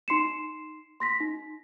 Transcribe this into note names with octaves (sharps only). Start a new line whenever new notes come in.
D#4 C6 C7 C#7 E7
C6 A#6 B6
D#4